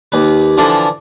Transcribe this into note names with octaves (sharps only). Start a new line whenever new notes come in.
D#2 B4
D3 E3 F3 D4